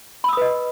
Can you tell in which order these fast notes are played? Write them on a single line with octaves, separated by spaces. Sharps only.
B5 E6 D#6 B4 D#5